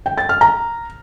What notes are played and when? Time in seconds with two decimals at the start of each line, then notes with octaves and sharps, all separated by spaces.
0.06 G5
0.18 A6
0.29 F6
0.41 A#5